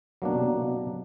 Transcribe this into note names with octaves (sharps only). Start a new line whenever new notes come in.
B2 F#3 A#3 D4
C3
B2
C3
B2